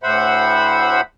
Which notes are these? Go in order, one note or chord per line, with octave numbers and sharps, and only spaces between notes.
D2 A2 C5 E5 F#5 B5